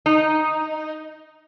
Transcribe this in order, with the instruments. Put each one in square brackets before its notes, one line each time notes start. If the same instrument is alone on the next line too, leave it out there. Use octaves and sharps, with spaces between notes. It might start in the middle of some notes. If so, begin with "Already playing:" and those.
[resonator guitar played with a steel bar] D#4